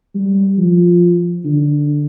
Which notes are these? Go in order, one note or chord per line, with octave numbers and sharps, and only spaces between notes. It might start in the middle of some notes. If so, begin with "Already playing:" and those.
G3
F3
D3